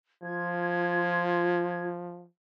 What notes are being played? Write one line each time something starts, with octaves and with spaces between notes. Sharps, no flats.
F3 F4 G#6